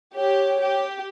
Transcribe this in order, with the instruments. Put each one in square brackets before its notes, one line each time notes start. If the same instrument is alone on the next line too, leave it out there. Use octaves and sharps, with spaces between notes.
[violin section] G4 [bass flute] C#5
[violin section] G4